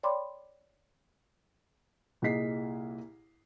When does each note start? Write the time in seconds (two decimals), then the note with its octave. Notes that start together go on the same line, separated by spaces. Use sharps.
0.03 C#5 D5 G5 B5 C6 D6
2.22 C2 A#2 G#4 D#5 B6 C7